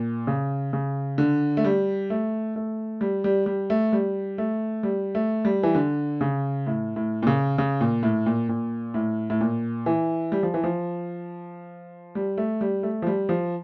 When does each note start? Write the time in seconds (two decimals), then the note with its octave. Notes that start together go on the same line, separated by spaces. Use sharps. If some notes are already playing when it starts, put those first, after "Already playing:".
Already playing: A#2
0.27 C#3
0.73 C#3
1.18 D3
1.57 A3
1.64 G3
2.10 A3
2.56 A3
3.01 G3
3.24 G3
3.46 G3
3.70 A3
3.93 G3
4.38 A3
4.83 G3
5.15 A3
5.45 G3
5.63 E3
5.75 D3
6.21 C#3
6.67 A2
6.96 A2
7.23 A#2
7.27 C#3
7.58 C#3
7.81 A#2
8.03 A2
8.26 A#2
8.49 A#2
8.94 A2
9.30 A2
9.41 A#2
9.86 E3
10.32 G3
10.43 F3
10.54 E3
10.64 F3
12.15 G3
12.38 A3
12.61 G3
12.83 A3
13.02 F3
13.07 G3
13.29 F3